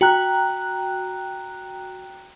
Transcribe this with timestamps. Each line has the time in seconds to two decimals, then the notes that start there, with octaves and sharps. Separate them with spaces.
0.01 F#4 G5 A#5 F#6